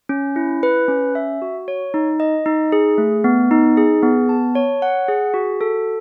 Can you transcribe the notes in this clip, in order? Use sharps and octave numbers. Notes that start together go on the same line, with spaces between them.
C#4
E4
B4
C#4
E5
F#4
C#5
D#4
D#5
D#4
G#4
A3
B3
D#4
G#4
B3
A5
C#5
F#5
G#4
F#4
A4